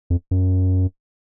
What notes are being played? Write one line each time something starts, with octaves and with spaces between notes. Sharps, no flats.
F2
F#2